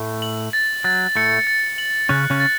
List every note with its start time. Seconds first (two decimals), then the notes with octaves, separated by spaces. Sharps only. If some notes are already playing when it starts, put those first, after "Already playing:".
Already playing: A2 A3
0.22 F#7
0.53 A6
0.84 F#3 A6
1.16 A2 A3 C#7
1.47 A6
1.78 F#7
2.09 C#3 C#4 F#6
2.30 C#3 C#4
2.40 A6